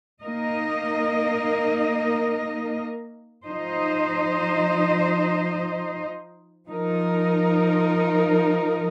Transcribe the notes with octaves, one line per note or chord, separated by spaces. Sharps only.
A#3 D#4 A#4 D#5
F3 D#4 C5 D#5
F3 D#4 A#4